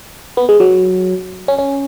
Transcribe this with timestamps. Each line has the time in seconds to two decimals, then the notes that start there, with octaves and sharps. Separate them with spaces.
0.37 B3
0.49 G#3
0.60 F#3
1.48 C#4
1.59 C#4